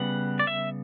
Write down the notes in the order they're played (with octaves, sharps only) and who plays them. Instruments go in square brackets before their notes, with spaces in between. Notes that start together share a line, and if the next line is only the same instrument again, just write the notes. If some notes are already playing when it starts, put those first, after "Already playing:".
Already playing: [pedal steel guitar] C#3 G3 B3 F#5
D5
E5